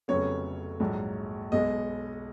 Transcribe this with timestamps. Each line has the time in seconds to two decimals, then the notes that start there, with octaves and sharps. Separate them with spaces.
0.08 F1 F2 C#3 F#3 B3 C#5
0.80 A#1 G#2 F#3
1.52 B1 B2 G#3 D#5